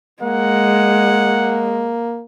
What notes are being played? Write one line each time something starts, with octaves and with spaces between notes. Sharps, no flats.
G#3 A#3 F#5